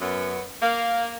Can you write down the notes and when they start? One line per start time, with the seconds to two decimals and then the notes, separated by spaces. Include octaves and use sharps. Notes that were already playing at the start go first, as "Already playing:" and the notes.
0.01 F#2 B3
0.62 A#3 F5